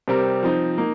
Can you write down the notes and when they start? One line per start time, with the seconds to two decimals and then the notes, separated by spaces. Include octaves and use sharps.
0.08 C3 G3 C4 G4 A#4
0.43 F3 C4 D#4
0.78 A#3 D#4